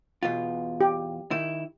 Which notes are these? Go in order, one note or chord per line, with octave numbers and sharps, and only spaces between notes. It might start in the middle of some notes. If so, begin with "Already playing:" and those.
E2 B2 F4
G4
D#3 E4